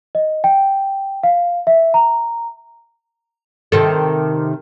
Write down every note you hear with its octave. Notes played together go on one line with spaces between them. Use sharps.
D#5
G5
F5
E5
A#5
C3 D#3 A4